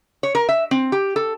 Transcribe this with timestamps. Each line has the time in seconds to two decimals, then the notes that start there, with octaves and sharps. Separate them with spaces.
0.23 C#5
0.35 A#4
0.49 E5
0.71 C4
0.92 G4
1.16 A4